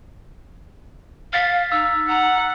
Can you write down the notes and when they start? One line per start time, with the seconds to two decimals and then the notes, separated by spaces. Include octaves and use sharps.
1.33 F5 F6 A6 B6
1.72 D#4 E6
2.09 F#5 A#5